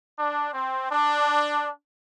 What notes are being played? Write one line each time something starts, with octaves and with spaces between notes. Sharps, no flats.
D4
C4
D4